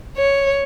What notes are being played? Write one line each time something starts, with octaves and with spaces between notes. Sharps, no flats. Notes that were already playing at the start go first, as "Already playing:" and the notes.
C#5